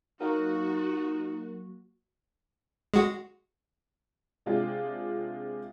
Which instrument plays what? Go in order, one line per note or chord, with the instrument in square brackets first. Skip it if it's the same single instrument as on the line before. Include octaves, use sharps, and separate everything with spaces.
[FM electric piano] F#3 A#3 [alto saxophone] D#4 [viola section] F#4 [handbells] A#4
[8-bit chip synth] G#3 F#4
[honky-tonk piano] C3 G#3 D4 F4 G4